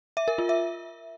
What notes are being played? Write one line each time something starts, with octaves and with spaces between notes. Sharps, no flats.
E5
A#4
F4
E5